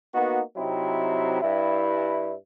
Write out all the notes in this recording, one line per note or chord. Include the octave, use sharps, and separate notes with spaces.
A#3 B3 D#4 F#4
C3 F#3 C4 D#4 E4
G2 E4